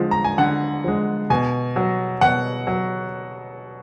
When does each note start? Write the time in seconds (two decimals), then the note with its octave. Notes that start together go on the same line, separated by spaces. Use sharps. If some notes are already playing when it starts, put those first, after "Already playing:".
Already playing: D3 F3 G#3
0.11 A#5
0.24 G#5
0.38 D3 F#5
0.84 F3 G#3
1.30 B2 G#5
1.76 F#3
2.21 B2 F#5
2.67 F#3